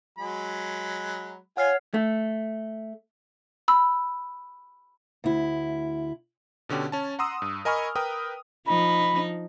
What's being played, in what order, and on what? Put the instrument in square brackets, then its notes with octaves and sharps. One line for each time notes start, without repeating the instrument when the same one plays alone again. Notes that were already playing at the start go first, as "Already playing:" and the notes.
[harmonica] F#3 G#3 B5
[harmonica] F4 G#5 [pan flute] C#5 [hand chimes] F#5 F6 C7
[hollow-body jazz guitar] A3
[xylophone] B5 E6
[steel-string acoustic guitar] D2 E4
[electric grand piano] B2 D3 C#4 G4
C#4 A5
F#5 A#5 C6 D#6 E6
G2
A#4 D#5 G#5 B5 C#6 F6
A#4 B4 G5 D#6
[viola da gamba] F3 D#4 [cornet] B5